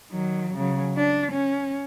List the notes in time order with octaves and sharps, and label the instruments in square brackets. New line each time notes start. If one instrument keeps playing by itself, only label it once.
[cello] D#3 F#3
C#3 F#3
D4
C#4